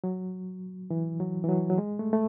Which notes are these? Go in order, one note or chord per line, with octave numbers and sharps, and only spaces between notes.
F#3
E3
F#3
E3
F#3
F#3
G#3
A3
A3